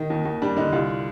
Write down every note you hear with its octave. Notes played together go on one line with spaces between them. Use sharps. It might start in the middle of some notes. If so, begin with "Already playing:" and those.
Already playing: D#3 D#4
D#2
D#2
G3 D4
D3 D#4
C2 F4